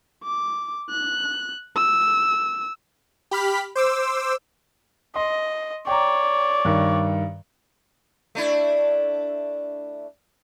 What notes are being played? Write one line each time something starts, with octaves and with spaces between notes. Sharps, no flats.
D6
F#6
E6
G4 B5 F6 B6
C5 D6 E6
D#5 C6
C#5 D5 G5 A#5
G2 D#3
A3 D4 E4